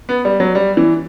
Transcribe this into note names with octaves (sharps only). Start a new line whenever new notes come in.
B3
G3
F#3
G3
E3